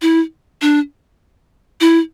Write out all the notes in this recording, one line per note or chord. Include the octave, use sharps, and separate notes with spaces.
E4
D4
E4